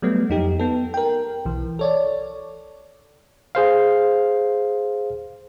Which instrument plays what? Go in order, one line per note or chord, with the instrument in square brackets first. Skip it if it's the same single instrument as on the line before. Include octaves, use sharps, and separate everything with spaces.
[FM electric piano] F#3 G3 A3 B3
F2 D#4 G4
B3 A4
A#4 G5
B1 E3
A4 C#5 D5
[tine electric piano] G#4 C5 F5